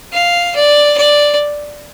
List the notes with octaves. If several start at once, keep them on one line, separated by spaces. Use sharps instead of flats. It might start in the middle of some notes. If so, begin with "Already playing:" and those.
F5
D5
D5